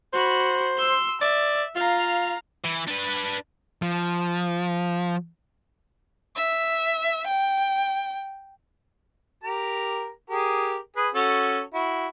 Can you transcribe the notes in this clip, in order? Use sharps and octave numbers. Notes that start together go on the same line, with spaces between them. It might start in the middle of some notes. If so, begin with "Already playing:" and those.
F#4 C5 B5
C6 E6
D5 E5
F4 F5 A#5
E3
D4 B4
F3
E5
G5
G4 A#4 A#5
G4 G#4 A#4
G#4 B4
C#4 F#4 A4
E4 F#4